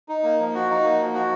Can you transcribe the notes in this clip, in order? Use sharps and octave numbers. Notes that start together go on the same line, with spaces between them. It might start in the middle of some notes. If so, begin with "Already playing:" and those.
D#4
A#3
F3
F#4
D#4
A#3
F3
F#4